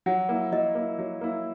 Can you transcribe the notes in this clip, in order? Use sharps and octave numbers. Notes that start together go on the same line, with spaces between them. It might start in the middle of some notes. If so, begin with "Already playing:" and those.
F#3 F#5
A#3 E4
F#3 D#5
A#3 E4
F#3
A#3 E4